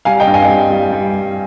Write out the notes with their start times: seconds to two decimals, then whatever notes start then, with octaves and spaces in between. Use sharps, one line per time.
0.05 G3 F5 G#5
0.20 D#5 G5
0.27 G2
0.34 F5 G#5
0.49 G3
0.70 G3
0.92 G3
1.13 G3